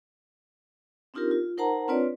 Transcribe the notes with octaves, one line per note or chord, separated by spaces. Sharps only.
C4 D4 D#4 F4 G4 A#4
F4
D#4 A#4 C5 F#5 A5 A#5
C4 D4 F4 B4 C#5 D5